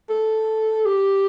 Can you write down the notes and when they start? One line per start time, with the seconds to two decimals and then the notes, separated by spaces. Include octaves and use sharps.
0.10 A4
0.85 G4